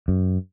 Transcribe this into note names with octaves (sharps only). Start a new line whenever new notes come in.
F#2